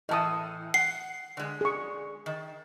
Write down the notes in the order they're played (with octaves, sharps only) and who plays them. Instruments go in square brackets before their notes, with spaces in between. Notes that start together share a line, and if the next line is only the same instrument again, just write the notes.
[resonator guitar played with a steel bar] A2 E3 [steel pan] D#5 A5 D#6
[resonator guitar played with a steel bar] F#5 [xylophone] C7
[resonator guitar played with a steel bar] D3 G#3
[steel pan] G#4 C#6
[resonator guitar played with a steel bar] D#3